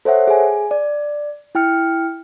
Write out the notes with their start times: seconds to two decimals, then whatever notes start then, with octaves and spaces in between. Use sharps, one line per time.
0.05 A4 C5 C#5 E5 F#5
0.27 G#4 G#5
0.71 D5
1.55 E4 G5 F6 C#7